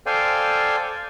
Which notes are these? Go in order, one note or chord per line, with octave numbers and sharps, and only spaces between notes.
A4 C5 D5 F5 G5 G#5